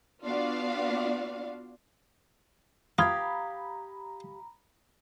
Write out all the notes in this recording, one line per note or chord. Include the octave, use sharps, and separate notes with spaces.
B3 D4 F4 F#4 D5 F5
F4 G4 F5 A#5 B5 D#6 G#6